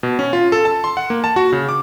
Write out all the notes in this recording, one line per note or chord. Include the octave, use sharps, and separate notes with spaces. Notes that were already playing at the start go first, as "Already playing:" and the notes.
B2
C#4
F4
A4
A5
C6
F#5
A#3
A5
F#4
C#3
D6